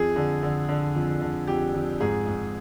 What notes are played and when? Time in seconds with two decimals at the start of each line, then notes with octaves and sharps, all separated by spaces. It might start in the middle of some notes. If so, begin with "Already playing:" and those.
Already playing: F2 G#4
0.16 D3
0.43 D3
0.68 D3
0.95 F2
1.21 D3
1.47 F2 G4
1.74 F2
2.00 G#2 G#4
2.27 G#2